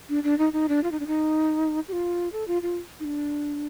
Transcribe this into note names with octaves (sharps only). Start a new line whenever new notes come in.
D4
D4
D#4
D#4
D4
F4
D#4
D4
D#4
G4
F4
A4
F4
F4
D#4
D4